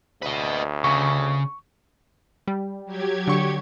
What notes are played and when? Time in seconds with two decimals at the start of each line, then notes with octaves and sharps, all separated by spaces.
0.22 D2 B4 D#5
0.84 C#3 C#6
2.47 G3
2.85 F#3 G4 G#6
3.27 D3 C#6